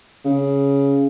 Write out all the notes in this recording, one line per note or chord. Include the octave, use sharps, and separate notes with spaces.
C#3